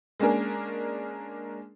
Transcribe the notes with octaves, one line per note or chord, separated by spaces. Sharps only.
G#3 A#3 C#4 D4 G#4 A#4